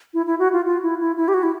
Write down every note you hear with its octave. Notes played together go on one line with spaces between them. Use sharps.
E4
E4
F#4
F4
F4
E4
E4
E4
G4
F#4
E4